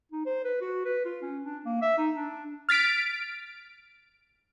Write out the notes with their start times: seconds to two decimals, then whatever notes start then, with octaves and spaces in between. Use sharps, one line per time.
0.12 D#4
0.26 C5
0.45 B4
0.61 F#4
0.85 B4
1.05 F4
1.22 C#4
1.45 D4
1.65 A#3
1.82 E5
1.98 D#4
2.16 D4
2.69 F6 A6 B6 D7